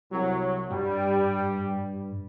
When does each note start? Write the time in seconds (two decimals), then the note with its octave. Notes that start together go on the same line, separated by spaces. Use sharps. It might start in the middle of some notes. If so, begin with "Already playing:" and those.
0.12 C2 F#3
0.70 G2 G3